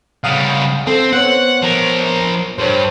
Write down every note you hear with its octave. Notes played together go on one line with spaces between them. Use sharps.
C#3 G3 F5 F#5 D#6
C4 A4
B3 C5 C#5 F#5
F3 A#4
G2 C5 C#5